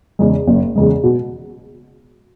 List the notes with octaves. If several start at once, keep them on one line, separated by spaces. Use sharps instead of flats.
E2 C#3 G#3
F#1
E2 C#3 G#3
B2